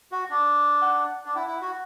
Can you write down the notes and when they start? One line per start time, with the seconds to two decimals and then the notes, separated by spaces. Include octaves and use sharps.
0.12 F#4
0.30 D4
0.82 F#5
1.25 D4
1.35 E4 F#5
1.47 E4
1.62 F#4